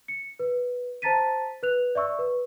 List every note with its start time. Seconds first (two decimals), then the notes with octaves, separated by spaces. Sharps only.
0.08 C#7
0.39 B4
1.02 C5 A5 A#5 A6 B6 D#7
1.63 B4 F#6 F7
1.95 D5 E5 C#6 E6
2.19 B4